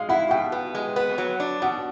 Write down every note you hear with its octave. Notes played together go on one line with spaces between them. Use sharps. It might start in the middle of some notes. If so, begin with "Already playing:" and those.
Already playing: G#3 F5
E4 F#5
B2 G5
B3
G#3
B3
F#3
D4
B2 F#5